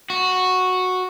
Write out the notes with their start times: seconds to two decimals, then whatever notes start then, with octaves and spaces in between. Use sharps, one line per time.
0.10 F#4